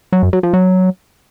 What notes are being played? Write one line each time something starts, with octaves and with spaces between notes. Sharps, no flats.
F#3
F#2
F#3
F3
F#3